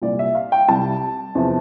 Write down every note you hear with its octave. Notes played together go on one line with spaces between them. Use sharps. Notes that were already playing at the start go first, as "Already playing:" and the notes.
C2 A#2 G3 D5
E5
F5
G5
C2 C3 G3 A5
E2 C3 F3